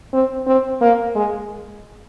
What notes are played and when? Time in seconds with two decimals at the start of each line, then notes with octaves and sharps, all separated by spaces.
0.13 C4
0.47 C4
0.81 A#3
1.15 G#3